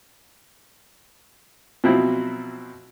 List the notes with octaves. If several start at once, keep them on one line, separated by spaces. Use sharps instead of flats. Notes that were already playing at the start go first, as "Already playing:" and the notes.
B2 F3 F#3 C4 E4